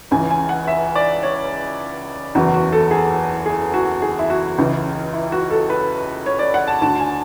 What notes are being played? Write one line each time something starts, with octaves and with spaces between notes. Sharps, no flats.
C#2 C#3 E3 G#5
G#5
F#5
E5
D5
C#5
F#1 E2 C#3 E3 F#4
F#4
A4
G#4
G#4
F#4
G#4
E4
F#4
C#2 C#3 E3
E4
F#4
A4
B4
C#5
D5
F#5
A5
D2 D3 A5
G#5